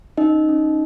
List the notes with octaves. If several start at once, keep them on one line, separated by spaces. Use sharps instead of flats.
C#4 D#4 D#5
C#4